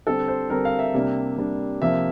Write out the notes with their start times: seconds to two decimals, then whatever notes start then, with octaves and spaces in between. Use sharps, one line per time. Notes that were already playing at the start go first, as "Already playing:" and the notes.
0.07 D3 G3 C4 A4
0.28 C5
0.50 D3 G3 C4 A#4
0.65 F5
0.79 E5
0.94 C3 G3 A#3 D4
1.37 C3 G3 A#3 D4
1.82 C3 F3 A#3 E5